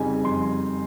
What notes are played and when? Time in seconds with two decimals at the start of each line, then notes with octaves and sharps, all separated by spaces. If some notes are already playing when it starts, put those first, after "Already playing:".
Already playing: F2 C#3 G3 C4 D#4 G#5
0.24 F2 C6